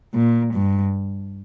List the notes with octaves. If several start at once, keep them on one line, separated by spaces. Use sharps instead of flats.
A#2
G2